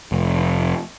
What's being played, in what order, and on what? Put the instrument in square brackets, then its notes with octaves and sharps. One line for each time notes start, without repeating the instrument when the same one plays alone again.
[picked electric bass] F1